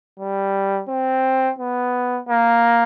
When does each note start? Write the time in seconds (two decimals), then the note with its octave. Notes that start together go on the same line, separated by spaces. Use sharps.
0.19 G3
0.88 C4
1.58 B3
2.29 A#3